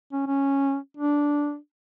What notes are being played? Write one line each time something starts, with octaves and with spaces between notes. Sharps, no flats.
C#4
C#4
D4